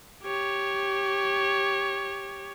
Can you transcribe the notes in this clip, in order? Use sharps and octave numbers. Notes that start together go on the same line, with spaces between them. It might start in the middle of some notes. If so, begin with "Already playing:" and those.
G4 C#5